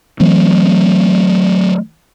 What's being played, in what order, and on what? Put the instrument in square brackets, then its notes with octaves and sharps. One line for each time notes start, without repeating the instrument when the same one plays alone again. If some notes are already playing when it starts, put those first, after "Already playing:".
[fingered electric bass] E3 F#3 A3 C4